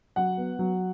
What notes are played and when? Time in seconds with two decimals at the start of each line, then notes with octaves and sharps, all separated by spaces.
0.16 F#3 F#5
0.37 B3
0.59 F#3